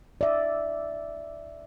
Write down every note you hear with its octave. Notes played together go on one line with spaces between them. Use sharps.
D5 E5